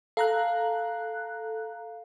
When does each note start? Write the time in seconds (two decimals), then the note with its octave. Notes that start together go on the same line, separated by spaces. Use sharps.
0.17 A4 F5 A#5 F#6